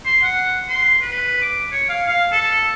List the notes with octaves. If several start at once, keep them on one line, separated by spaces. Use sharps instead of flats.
C6
F#5
C6
B4
D6
C#5
F5
F5
A4